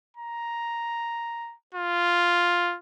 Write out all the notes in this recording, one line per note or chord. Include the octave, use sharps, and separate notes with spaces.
A#5
F4